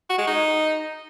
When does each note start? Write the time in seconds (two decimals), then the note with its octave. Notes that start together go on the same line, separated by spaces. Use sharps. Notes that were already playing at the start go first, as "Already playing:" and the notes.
0.10 F#4
0.18 G#3
0.27 D#4